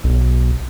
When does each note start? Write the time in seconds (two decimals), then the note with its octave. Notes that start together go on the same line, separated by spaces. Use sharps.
0.04 B1